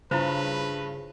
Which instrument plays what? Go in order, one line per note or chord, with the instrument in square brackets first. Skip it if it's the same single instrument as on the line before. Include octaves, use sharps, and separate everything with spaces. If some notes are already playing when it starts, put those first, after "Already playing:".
[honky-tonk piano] G2 [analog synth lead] C#3 [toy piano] E4 F4 C5 [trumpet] B4